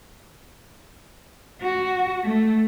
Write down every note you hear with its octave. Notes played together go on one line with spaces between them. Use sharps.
F#4
A3